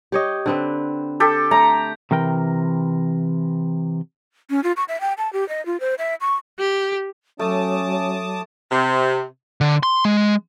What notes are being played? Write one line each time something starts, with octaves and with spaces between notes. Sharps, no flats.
G4 C#5 D#5
D3 C4 B4
G4 A4
A3 A#5
C3 E3 A#4 G5
C#4
F4
C#6
E5
G5
A5
G4
D#5
F4
C5
E5
C#6
G4
F#3 A3 C#4 A5 D6 D#6
C3
D3
C6
G#3